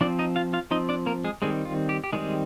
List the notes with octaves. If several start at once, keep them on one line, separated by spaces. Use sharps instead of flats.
F3 C4 D4 D5
D#4 D#5
F4 F5
F4 F5
F3 C4 D#4 D#5
D4 D5
A#3 A#4
G#3 G#4
D#3 G3 G#3 C4 G#4
F4
G4
G4
D#3 G3 G#3 C4 G#4